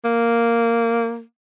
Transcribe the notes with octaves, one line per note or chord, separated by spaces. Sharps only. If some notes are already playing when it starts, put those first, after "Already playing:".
A#3